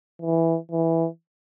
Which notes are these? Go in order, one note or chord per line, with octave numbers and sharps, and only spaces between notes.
E3
E3